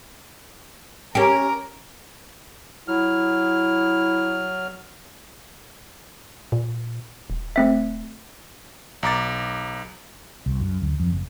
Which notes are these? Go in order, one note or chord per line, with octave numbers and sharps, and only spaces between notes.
C#4 G4 A#4
F#3 E4 F6
A#2
D#1
A3 C4 E5
B1 A#5 D6 A6
C2
F#2
D2
F2
F#1